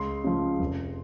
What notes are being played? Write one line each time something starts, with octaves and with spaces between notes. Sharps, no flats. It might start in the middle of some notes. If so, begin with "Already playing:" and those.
Already playing: C#2 C6
C#3 F3
F1